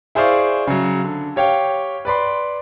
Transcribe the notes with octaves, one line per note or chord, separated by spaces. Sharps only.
E4 G#4 C5 D5 F5 C#6
C#3 F#3
D3
G4 C#5 F5 G5
B4 D5 B5 C6